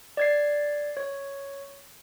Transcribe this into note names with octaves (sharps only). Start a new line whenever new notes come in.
D5 G#6 C7
C#5